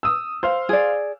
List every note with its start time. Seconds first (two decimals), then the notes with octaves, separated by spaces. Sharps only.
0.03 D#6 E6
0.43 C5 F5
0.69 G#4 D5